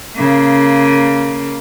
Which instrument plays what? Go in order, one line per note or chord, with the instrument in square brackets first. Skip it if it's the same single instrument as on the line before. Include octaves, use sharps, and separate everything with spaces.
[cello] C#3 A#3